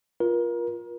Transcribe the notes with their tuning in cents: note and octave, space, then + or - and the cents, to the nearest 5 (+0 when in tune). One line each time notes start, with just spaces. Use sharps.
F4 +0 A#4 +30